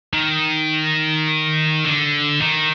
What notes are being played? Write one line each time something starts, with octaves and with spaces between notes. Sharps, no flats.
D#3
D3
D#3